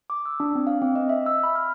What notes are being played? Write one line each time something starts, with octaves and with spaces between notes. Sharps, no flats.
D6
E6
D4
C4
F5
C4
D#5
E5
E6
B5
F6